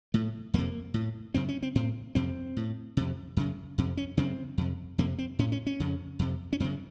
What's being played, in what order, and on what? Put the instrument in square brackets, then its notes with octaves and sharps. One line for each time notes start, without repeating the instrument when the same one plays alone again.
[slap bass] A2 A3
F2 C3 A#3
A2
F#2 C#3 C4
C#4
C4
A2 C4
F2 C3 C4
A2
F2 C3
F#2 C#3
F2 C3
C#4
F#2 C#3 C4
F2 C3
F2 C3 A#3
C4
A2 C#4
C#4
C#4
F2 C#3
F2 C3
C#4
F#2 C4
C#3